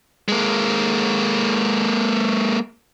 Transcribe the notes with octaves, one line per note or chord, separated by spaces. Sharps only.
G#3 A#3